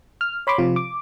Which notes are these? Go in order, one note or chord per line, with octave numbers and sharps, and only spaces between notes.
F6
C#5 B5 C6 D6
C3 F3 F4
D6